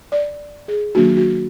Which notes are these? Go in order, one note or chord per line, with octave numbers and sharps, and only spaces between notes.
D5
G#4
D#3 F#3 A#3 D4 F#4
F#4